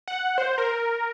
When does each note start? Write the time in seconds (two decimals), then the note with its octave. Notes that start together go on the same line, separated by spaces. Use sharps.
0.08 F#5
0.38 C5
0.58 A#4